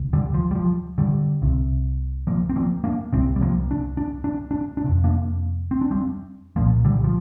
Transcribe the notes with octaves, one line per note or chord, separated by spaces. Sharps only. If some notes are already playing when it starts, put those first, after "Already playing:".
Already playing: D2 C3
D3 G3
F3
G3
F3
D3 G3
C2 C3
F3 A#3
C4
F3 A#3
A#3 D4
C2 C3 G3 C4
G3
F3 A#3
D4
D4
D4
D4
D4
F2 C3
A#3 D4
C4
D4
G3 C4
C2 A#2 F3 A#3
D3 G3
F3